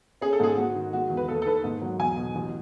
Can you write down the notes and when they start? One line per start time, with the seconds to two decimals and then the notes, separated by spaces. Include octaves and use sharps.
0.21 C#4 G#4
0.33 A4
0.40 G#2 G#4
0.57 G#2 F#4
0.75 D#3
0.93 G#3 F#4
1.10 E2
1.17 B4
1.28 D#2 A4
1.42 A4
1.46 D#3 B4
1.64 G#2
1.82 F#3
1.98 E2 G#5
2.16 B2
2.35 A1